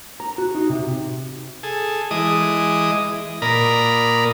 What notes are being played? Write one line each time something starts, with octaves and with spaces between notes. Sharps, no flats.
A#5
F#4
D#4
C3
G#4 A4
E3 G#3 D#5 D6 D#6
A#2 A#4 D5 A#5 B5 D#6